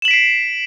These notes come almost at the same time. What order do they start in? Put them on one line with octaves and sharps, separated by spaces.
E7 F#7 B6 D7 C7